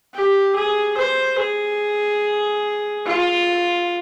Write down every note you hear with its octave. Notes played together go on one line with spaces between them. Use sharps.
G4
G#4
C5
G#4
F4